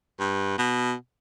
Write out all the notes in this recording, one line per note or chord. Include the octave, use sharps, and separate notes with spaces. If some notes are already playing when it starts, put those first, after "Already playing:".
G2
B2